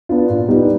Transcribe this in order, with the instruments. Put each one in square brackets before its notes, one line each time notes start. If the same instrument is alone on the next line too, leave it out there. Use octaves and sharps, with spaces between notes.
[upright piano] B3 D4 F4
A#2
G3 B3 D#4